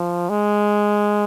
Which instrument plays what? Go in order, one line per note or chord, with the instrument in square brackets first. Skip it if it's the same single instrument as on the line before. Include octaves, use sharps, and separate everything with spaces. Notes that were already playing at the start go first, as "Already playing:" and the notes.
Already playing: [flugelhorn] F3
G#3